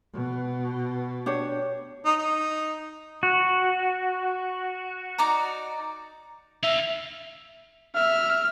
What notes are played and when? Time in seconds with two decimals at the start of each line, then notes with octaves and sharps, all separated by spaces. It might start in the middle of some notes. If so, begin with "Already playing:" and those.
0.14 B2
1.26 D4 G4 C#5
2.05 D#4
2.18 D#4
3.23 F#4
5.18 D#4 D5 A#5
6.63 D#4 E5 F5
7.95 E5 F6